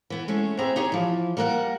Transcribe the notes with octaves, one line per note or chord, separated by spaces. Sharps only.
E3 B3
G#3 A3 C#4
B3 C4 G4 G#4 E5 A#5
D#4 G4 G#4 C#5
E3 F3
G3 A#3 A#4 D#5 F#5